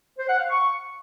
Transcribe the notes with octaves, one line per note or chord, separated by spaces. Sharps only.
C5
F#5
F5
C#6